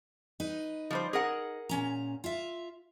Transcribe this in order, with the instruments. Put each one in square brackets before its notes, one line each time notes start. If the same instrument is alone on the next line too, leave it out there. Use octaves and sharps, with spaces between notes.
[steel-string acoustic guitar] D#4 B4
[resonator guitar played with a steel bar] F3 G3 C5
G#4 A#4 F#5
[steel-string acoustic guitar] A#2 C#4 A#5
F4 E5